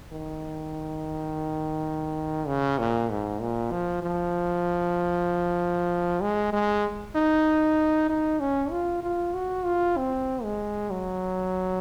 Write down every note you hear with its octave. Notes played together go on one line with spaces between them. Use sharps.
D#3
C#3
A#2
G#2
A#2
F3
F3
G#3
G#3
D#4
D#4
C#4
F4
F4
F#4
F4
C4
G#3
F#3